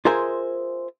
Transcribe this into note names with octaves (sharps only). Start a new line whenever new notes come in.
F4 G#4 A#4 C5 E5 G#5